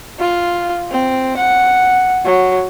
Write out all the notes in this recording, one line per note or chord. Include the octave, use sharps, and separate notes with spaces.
F4
C4
F#5
F#3